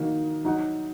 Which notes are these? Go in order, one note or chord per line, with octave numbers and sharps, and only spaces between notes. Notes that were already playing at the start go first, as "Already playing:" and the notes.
Already playing: D#3 A#3 D#4 F#4
F#3 D#4 F#4